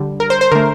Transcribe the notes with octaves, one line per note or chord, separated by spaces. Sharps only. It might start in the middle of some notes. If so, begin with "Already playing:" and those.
Already playing: D3 G3
A#4
C5
C5
D3 A3 A#4